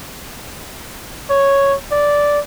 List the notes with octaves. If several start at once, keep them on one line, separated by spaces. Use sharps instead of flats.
C#5
D5